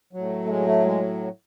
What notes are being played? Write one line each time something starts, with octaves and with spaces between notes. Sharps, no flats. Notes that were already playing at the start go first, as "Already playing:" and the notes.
A2 F#3
A3
G#3
A3
G#3